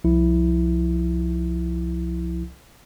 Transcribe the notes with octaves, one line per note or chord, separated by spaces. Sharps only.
C2 F3 E4